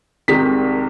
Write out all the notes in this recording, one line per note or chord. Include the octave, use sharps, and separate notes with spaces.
C2 C3 D#3 G#3 B6